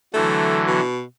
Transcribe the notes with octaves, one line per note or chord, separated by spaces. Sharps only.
D3 E3 F#3 A3
B2